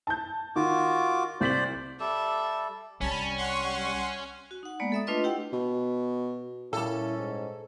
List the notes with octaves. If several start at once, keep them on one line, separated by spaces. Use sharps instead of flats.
A5 G6
D#3 F4 F#4 D6
C2 C5 D5 B6 F#7
G3 A4 D5 E5
C2 G3 C#4 A5 B5
F#5 C6 C#6
F#4
D#4 F#5
G#3 A#3 B3 D5
A4 E5 D#6
A3 D4 F4 B4 D#5 C6
E4 G4 F#5 G5
B2
A#2 G3 C#4 E4 A4
G#2